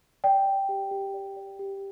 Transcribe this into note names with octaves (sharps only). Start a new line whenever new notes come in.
D5 G5
D5
G4
G4
D5
D5
G4